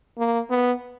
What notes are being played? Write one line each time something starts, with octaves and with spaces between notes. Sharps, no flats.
A#3
B3